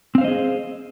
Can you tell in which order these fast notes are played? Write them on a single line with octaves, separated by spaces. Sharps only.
C4 F5 C5 D#5 G#4